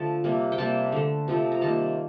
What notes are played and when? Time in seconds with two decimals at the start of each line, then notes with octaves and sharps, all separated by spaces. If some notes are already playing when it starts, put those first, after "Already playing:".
Already playing: D3 F3 A3 A5
0.24 C3 G3 A#3
0.52 G5
0.58 C3 G3 A#3 A5
0.92 D3 A3
1.28 C3 F3 A3
1.52 A#5
1.61 C3 D#3 G3 A#3 A5